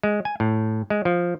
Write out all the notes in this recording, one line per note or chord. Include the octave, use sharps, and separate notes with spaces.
G#3
G#5
A2
G#3
F3